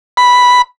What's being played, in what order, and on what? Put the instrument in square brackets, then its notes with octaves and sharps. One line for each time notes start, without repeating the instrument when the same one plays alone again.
[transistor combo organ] B5